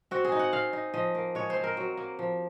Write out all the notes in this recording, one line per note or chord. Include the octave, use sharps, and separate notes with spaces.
C4 F#4
G#4
D#4
F#5
C4 F5
D#4
F3 D#5
A#3
G#3 C#5
C5
C4
A#4
F#3
A#3
F3